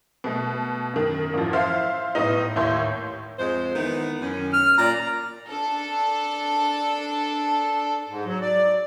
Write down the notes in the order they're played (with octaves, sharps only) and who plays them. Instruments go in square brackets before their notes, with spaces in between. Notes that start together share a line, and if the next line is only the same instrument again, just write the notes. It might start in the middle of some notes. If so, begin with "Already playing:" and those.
[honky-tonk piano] B2 A3
F#2 D#3
A1 F#2 F3
C5 E5 F5
A2 B3 D#4
D#2 A2 E4 C#5 C6 G6
[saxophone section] F2 G#3 C5
D#3 E3 B3
F#2 D#3 C#4
[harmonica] F6
[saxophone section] A#2 D5 [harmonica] A#5
[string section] D4 A4
[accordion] G#2
F#3
D5